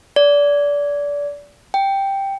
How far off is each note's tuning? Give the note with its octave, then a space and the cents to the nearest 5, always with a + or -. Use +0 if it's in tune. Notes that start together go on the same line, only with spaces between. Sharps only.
D5 -25
G5 +0